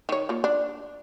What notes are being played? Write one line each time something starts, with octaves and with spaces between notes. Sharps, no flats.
D#3 C#5
A#3 F4
D4